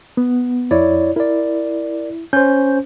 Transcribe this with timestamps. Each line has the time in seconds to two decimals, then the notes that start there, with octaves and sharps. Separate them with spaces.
0.17 B3
0.71 F2 E4 C#5 D5
1.16 E4 A#4 D5
2.33 C#4 C5 G6